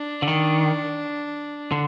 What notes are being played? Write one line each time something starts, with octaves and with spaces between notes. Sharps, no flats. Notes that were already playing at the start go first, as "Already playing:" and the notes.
Already playing: D4
D3
D#3
D3